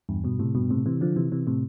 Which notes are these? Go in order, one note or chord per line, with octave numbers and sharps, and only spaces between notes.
E2 G2
G2 B2
A2 C3
G2 B2
A2 C3
C3 E3
D3 F3
C3 E3
C3 E3
A2 C3